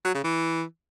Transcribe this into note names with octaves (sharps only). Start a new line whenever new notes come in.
F#3
C#3
E3